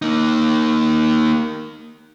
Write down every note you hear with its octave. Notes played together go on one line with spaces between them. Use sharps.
A#3 D#4